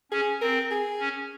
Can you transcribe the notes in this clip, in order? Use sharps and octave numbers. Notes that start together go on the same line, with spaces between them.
C#4 G#4
C4 A#4
G#4
C#4